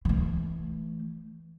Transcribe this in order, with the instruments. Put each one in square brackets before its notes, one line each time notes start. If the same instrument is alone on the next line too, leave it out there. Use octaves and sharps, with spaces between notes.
[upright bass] E3 A3